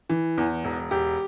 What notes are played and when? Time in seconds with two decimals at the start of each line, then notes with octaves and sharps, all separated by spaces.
0.10 E3
0.38 E2
0.64 E1
0.91 E1 G4